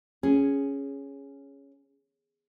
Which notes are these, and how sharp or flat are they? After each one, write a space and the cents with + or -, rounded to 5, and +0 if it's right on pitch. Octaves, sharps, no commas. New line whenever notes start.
C#4 +0 G#4 +0